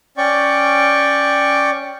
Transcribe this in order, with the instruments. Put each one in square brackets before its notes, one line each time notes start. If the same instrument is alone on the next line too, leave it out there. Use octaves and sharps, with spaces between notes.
[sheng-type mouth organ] C#4 D5 G5 C#6